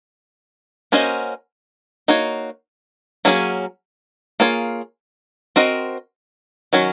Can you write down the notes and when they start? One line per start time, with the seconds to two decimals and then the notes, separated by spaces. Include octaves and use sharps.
0.92 A#3 C#4 F#4 C5 D#5
2.08 A#3 D#4 F#4 C#5
3.25 F#3 A#3 C#4 G#4
4.40 A#3 F4 G#4 C#5
5.56 C4 F#4 A#4 D#5
6.73 D#3 F#3 C#4 F#4